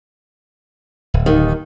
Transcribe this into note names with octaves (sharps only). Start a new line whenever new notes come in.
D1
D#2 D#3